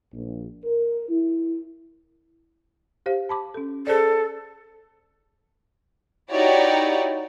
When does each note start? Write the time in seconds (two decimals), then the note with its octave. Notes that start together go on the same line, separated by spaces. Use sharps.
0.13 A#1
0.65 A#4
1.09 E4
3.06 G4 C5 F5
3.29 A5 B5 D6
3.54 C#4 A4
3.87 G#4 A4 C5 D5
6.30 D#4 E4 F#4 G4 C#5 D5